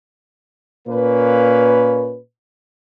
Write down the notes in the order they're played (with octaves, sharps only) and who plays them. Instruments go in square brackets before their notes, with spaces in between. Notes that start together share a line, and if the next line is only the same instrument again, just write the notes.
[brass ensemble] A#2 A#3 C#4 B4